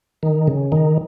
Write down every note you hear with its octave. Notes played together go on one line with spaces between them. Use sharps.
D#3
C#3
D#3